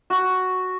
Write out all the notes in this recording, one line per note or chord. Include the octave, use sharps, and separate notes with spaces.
F#4